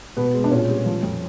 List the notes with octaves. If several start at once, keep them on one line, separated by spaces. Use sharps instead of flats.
B2 B3
G#3
D4
A#2 C#4
G3
F3
F2